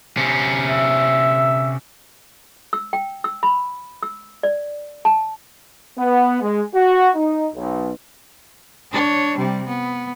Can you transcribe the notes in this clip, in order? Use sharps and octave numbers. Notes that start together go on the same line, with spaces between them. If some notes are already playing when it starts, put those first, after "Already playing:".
C3 C#4
E5
E6
G5
E6
B5
E6
D5
A5
B3
G#3
F#4
D#4
B1
D4 C#5
C3 G3
B3